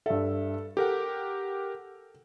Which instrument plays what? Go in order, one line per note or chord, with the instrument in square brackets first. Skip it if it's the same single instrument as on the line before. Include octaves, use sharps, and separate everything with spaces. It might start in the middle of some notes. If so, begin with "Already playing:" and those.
[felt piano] G2 E5 [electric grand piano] A4
[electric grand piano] G4 A#4 F#5 [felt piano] A4